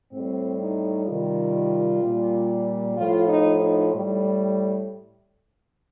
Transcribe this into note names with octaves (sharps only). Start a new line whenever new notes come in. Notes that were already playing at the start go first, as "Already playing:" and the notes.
A2 G3 C4
D#4
C3 D#3 G3 F4
A#2 G3
A2 F3 F4
D#4
D#4
A2 G3